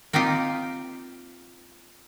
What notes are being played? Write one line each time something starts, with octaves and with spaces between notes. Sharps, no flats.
A#3 C4 D#4 F4 G4